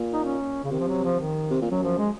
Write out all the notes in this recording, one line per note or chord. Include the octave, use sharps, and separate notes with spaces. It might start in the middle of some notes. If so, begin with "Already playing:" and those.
Already playing: A#2
D#4
C#4
C#3
C3 D#3
F3
F#3
F3
D#3
C3
A#2
F#2 F#3
F3
G#3